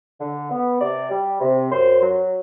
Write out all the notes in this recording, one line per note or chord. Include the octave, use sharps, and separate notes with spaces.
D3
B3
C3 D5
G3
C3
F#2 C5
F#3